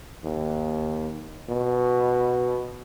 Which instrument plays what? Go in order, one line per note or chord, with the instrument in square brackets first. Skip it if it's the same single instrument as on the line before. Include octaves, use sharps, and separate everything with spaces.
[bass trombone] D#2
B2